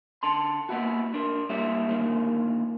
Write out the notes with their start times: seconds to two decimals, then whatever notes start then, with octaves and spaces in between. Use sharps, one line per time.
0.23 D3 A5 C6
0.69 A#3 B3 E4 F#4
1.14 D4 A#4
1.49 G3 A#3 E4 G4 C#5 E5
1.89 A#2 D3 D#3 A#3